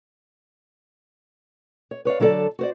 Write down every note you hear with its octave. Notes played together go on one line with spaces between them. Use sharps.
C#5
B4 C#5 D5 F5
D3 F#3 E4 A4 D5 A5
F#4 C5 D5